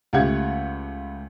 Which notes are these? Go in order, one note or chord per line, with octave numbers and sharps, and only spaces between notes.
C#2 A3 G4 F#5 G#6